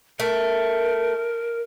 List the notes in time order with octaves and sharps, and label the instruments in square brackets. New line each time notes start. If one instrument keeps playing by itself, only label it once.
[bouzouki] A3 [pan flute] A#4